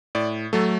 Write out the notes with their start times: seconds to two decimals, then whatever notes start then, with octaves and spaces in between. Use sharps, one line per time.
0.15 A2 D5
0.53 F#3 A3 A4